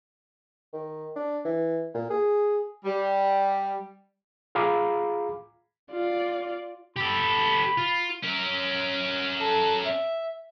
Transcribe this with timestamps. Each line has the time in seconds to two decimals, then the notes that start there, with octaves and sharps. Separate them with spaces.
0.73 D#3
1.16 D4
1.45 E3
1.94 A#2
2.10 G#4
2.85 G3
4.55 F4 G#4 F5 A#5 B5 D6
5.92 F4 D5
6.96 G4 A4 B5
7.77 F4
8.23 C#4 A#4
9.40 A4
9.86 E5